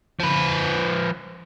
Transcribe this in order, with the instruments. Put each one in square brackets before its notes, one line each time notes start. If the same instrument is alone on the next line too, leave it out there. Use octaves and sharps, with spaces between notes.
[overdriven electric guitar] F3 B4